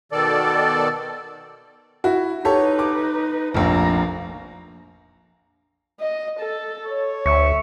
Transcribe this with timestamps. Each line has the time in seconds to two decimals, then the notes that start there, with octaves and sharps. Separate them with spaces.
0.12 B2 D#3 A4 D5
2.04 E4 F#4
2.45 D#4 G4 A4 B4 C#5
2.79 D6
3.54 F1 A#1 A#3 A#5
6.00 D#5
6.40 A4
6.86 C#5
7.26 D2 E5 C#6